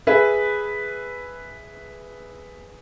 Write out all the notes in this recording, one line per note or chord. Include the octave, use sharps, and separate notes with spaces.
G#4 B4 E5